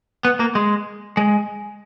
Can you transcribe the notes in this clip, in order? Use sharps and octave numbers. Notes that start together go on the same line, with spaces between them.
B3
A#3
G#3
G#3